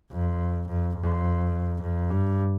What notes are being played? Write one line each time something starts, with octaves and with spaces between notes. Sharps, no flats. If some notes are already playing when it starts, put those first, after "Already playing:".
F2
F2
F2
F2
G2